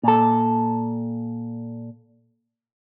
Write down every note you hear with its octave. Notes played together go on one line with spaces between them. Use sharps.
A#2 A4